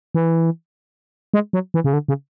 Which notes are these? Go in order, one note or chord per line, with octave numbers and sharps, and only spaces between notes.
E3
G#3
F#3
E3
C#3
D3
C#3